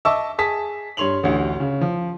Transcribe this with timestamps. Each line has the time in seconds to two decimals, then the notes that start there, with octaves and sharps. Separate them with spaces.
0.05 D#5 E5 A5 C#6 D6 E6
0.39 G#4 A5 D#6 B6
0.97 G2 C#5 C6 F7 F#7
1.23 A1 D2
1.60 C#3
1.81 F3